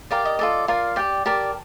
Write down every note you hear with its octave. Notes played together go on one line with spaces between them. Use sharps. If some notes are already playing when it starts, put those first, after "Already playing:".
G4 A#4 D5 F5
D#5
F4 A4 D5
F4 A#4 D5 F5
G4 D5 G5
G4 A#4 D5 A5